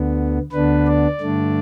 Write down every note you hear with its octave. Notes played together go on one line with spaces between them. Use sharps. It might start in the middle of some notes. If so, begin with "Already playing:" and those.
Already playing: D2 D3 B3
D2 D3 B3 D4 B4
D5
G2 D3 A3 D4